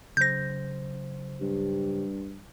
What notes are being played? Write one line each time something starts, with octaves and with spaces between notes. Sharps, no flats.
C#3 F#3 C5 G6 A#6
G2 G4